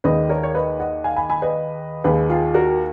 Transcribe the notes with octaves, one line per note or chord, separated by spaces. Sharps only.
D#2 D#3 G#3 B4 D#5
A#4 C#5
C#5
B4 D#5
D#5 F#5
F5 G#5
G#5 B5
G#5 B5
B4 D#5
D#2 D#3 G#3 G#4 B4
F4 G#4
F#4 A#4